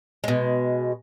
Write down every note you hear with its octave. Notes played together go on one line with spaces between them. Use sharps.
B2 G#3